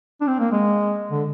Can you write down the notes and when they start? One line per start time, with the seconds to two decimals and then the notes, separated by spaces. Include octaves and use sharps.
0.21 D4
0.27 C4
0.40 A#3
0.52 G#3
1.11 D3